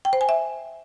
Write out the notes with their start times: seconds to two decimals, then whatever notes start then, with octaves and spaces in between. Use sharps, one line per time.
0.05 G5
0.13 C5
0.21 G#5
0.29 E5